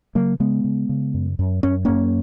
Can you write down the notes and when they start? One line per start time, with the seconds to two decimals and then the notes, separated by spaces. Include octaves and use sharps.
0.15 C#3 F#3 A#3
0.40 C#3 G#3 B3
0.64 C#3
0.89 C#3
1.14 F#2
1.39 F#2
1.63 F#2 C#4
1.85 F#2 A#3 C#4